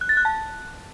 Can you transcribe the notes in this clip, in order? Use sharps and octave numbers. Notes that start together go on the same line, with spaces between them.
F#6
A6
F#6
A5